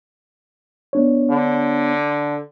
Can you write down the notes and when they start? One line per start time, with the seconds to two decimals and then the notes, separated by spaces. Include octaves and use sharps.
0.93 B3 D4 C#5
1.30 D3